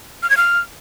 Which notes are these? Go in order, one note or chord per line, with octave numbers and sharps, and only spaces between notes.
F6
G#6
F6